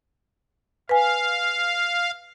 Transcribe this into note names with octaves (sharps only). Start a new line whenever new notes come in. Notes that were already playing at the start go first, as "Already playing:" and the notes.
B4 F5 G#5